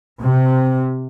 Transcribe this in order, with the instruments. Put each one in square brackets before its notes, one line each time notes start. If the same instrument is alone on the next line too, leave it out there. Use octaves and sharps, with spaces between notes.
[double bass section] C3